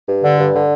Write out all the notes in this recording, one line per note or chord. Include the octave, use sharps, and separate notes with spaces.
G2
D3
G2
D3